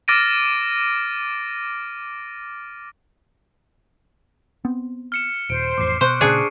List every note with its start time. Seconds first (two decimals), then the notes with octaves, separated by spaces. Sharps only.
0.08 D6 F6 A6 A#6 D7 D#7
4.65 B3 C4
5.12 F6 C#7 E7
5.50 D#1 C5 D7
5.78 A1 F2 D6 C7
6.01 B2 C5 C#6 F#6
6.21 A#2 C#3 D4 G#4 D6 C#7 D#7